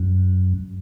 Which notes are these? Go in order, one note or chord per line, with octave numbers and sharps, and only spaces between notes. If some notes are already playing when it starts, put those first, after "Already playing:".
Already playing: F#2